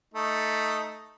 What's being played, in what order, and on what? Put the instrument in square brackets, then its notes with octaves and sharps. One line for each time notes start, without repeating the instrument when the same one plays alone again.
[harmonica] A3 D#4